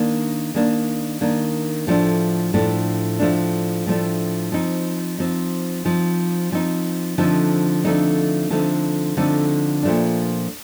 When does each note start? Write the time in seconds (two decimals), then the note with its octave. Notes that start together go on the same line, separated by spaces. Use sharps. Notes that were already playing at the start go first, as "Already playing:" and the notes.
Already playing: D#3 A#3 D4
0.55 D#3 A#3 D4
1.21 D#3 A#3 D4
1.87 A2 F3 A3 D4
2.54 A2 F3 A3 D4
3.19 A2 F3 A3 D4
3.86 A2 F3 A3 D4
4.52 F3 C4 D#4
5.18 F3 C4 D#4
5.85 F3 C4 D#4
6.52 F3 C4 D#4
7.18 D3 F3 A3 C4 D#4
7.84 D3 F3 A3 C4 D#4
8.50 D3 F3 A3 C4 D#4
9.17 D3 F3 A3 C4 D#4
9.83 A#2 F3 A3 D4